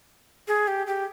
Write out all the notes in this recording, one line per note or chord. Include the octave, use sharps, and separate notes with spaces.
G#4
G4
G4